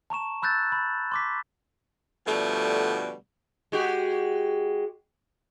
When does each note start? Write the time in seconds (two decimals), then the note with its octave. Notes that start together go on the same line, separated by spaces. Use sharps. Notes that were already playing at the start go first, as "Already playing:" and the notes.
0.10 A5 A#5 C#6 E7
0.42 B5 E6 F#6 G6 A6
0.72 B5
1.12 C6 D6 B6
2.27 B2 D3 F3 G3 A3
3.72 G#3 F#4 G4